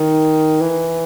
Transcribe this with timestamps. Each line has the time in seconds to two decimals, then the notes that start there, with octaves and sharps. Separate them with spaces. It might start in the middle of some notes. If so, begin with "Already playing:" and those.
Already playing: D#3
0.61 E3